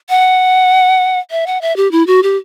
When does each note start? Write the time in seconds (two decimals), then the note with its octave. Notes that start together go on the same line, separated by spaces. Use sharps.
0.09 F#5
1.31 E5
1.47 F#5
1.61 E5
1.76 G4
1.92 E4
2.07 F#4
2.23 G4